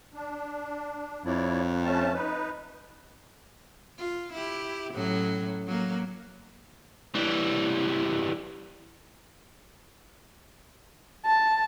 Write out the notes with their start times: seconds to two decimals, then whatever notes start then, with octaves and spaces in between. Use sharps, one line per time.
0.14 D4
1.25 F2 E4 C#5 D5
1.84 A3 C#4 A5
2.14 D#4 B4
3.98 F4
4.33 E4 G4
4.94 A2 F#3 C#4
5.67 F#3 A#3
7.15 E3 G3
11.26 A5